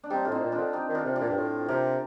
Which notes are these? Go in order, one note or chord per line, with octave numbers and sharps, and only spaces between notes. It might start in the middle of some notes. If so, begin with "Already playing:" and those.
D4
G3 C4 D#4
A2 F4
C4 D#4
A#2
D4 F4
D3
D#4 G4
D#3
D4 F4
C3
D4 F4
A#2
G2
A2
C3 G4 A#4